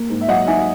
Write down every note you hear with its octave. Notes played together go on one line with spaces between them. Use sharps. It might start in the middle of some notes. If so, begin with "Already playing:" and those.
Already playing: A#3
G#2
E5
F#3 D#5 F#5
D#4 E5 G#5